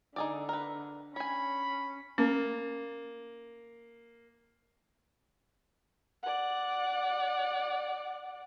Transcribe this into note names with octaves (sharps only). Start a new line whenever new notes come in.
D3 D#4 G#4 D5
A#4 B4
C#4 C#5 G#5 B5
A#3 C#4
D5 F#5